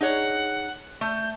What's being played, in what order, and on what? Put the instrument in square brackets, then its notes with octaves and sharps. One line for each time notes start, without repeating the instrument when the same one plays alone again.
[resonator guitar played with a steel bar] D#4 G#4 C#5 [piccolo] F#5
[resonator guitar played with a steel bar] A3 [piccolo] G6